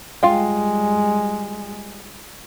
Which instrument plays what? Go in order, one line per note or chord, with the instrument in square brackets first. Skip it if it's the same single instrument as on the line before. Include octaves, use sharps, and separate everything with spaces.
[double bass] G3 G#3 [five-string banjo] F4 F5 G5